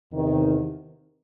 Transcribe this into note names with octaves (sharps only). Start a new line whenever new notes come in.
E2 C3 D#3